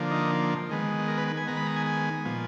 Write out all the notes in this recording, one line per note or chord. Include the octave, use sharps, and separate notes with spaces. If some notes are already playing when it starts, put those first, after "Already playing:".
Already playing: D3 F3 A#3
D#4
D#3 G#3 B3
A#4
B4
B4
G#5
D#3 G#3 B3 A#5
B5
A#5
G#5
G#5
A#2 F3 B3